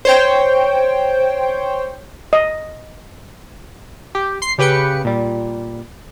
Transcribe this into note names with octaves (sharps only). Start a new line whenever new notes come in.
C5 C#5 G5
D#5
G4
C6 C7
C#3 G4 B4 G5 C#7
A#2 G3